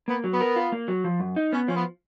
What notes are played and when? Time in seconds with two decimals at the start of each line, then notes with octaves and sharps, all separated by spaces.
0.08 A#3 B3
0.24 F#3
0.32 B3
0.41 A#4
0.56 F4
0.72 A#3
0.88 F#3
1.04 F3
1.20 F#2
1.36 D#4
1.52 B3 C#4
1.67 F3 C#4
1.76 B3